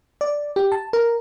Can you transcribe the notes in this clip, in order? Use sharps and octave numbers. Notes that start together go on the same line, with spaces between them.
D5
G4
A5
A#4